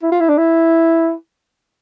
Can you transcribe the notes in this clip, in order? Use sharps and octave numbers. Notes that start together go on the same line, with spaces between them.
E4
F4
E4
D4
E4